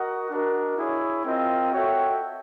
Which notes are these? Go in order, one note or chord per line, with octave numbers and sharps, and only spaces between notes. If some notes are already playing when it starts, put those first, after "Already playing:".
Already playing: F#4 A#4 D#5 F#5
D4 F#4 A#4 D#5
E4 G#4 C#5
C4 F4 A#4 D#5 G5
F#4 A4 C#5 E5 G5